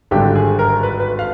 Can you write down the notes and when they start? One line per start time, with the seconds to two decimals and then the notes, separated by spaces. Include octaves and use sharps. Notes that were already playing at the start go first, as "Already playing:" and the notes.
0.11 G#1 G2 D3 G4
0.35 G#4
0.59 A#4
0.83 B4
1.00 B4
1.19 F5